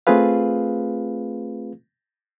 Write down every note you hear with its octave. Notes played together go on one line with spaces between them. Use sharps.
A3 C4 F4 G#4 B4 F5